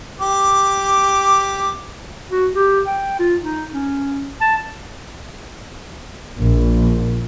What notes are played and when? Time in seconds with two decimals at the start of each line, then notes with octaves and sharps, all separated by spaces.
0.21 G4 D6
2.31 F#4
2.55 G4
2.87 G5
3.19 F4
3.41 D#4
3.74 C#4
4.41 A5
6.39 A#1